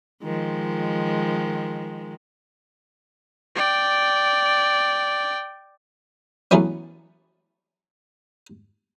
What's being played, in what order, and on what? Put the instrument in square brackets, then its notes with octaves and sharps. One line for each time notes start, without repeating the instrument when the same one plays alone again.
[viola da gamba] D#3 F3 G#3
[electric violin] D5 G5
[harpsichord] E3 F#3 A3 B3 C#4